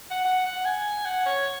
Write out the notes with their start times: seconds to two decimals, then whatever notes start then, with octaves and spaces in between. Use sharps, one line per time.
0.10 F#5
0.25 F#5
0.45 F#5
0.65 G#5
1.05 F#5
1.26 C#5